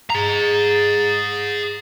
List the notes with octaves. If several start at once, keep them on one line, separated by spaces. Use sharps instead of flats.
G#4 A#5